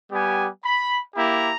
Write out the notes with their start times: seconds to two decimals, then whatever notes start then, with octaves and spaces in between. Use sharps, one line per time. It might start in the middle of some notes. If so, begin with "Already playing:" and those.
0.11 G3 B3 G4 G#5
0.63 B5
1.15 A#3 E4 G4 A#5